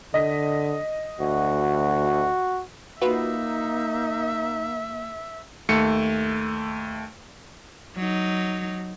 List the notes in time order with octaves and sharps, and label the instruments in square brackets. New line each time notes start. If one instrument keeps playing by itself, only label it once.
[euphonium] D3 [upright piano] D#5 B6
[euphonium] D2 [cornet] F#4
[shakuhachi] A#3 [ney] D#4 [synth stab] F4 F#4 B4 [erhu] E5
[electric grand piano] D#2 A3 C#7
[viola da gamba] F#3 D#4